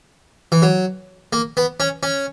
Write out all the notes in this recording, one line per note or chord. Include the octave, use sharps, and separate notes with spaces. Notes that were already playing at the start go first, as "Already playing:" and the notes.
E3
F#3
A#3
B3
C#4
C#4